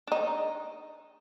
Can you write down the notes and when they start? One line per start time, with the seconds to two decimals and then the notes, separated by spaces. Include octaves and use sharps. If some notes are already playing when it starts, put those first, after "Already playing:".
0.07 D4 D#4